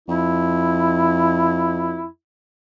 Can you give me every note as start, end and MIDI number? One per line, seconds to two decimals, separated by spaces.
0.09 2.06 41
0.09 2.08 64